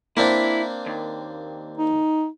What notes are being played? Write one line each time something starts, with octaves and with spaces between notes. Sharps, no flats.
A#3 C4 D4 E4
D#2
D#4